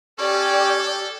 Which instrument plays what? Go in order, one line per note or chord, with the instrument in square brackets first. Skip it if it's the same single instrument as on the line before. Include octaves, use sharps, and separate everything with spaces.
[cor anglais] C#4 [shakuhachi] G4 [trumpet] A4 [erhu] D5